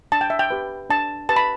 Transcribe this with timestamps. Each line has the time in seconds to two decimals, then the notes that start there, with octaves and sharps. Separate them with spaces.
0.12 D4 A5
0.21 G5
0.30 E5
0.39 G5
0.50 G4 B4
0.90 D4 A5
1.29 G4 B4 A5
1.36 B5